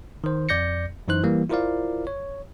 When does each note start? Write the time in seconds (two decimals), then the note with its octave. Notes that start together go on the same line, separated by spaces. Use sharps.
0.24 D#3 C5
0.49 F2 D5 G6 A#6 C#7
1.08 F#2 E3 D#4 C5 F#6
1.23 E3 G3 A#3
1.50 E4 F4 A#4 C5 D5 F5
2.07 C#5